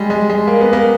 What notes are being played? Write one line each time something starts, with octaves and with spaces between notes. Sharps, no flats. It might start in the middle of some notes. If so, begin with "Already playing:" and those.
Already playing: G3 G#3
G#3
G#3
A#3
B3
A#3